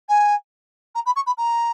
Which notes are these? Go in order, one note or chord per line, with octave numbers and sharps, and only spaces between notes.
G#5
A#5
B5
C#6
B5
A#5